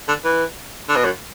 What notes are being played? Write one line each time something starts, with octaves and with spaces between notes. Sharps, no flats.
D3
E3
D3
B2
F#2